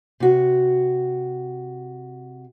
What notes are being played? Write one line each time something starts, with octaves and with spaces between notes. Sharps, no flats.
C3 F#4